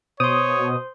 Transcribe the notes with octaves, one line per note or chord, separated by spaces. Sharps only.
B2 C5 C#5 C6 D#6